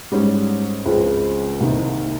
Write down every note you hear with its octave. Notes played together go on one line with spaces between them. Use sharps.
G#2 G3 C#4
C#2 C#3 F3 G#3 C4
C2 C3 D#3 A#3